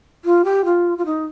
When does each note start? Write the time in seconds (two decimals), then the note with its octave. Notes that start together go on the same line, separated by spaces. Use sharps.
0.25 F4
0.45 G4
0.65 F4
0.98 F4
1.06 D#4